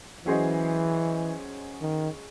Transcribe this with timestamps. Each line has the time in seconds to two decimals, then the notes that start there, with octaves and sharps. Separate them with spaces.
0.25 E3 F#3 C#4 G#4 C5 D#5
1.81 D#3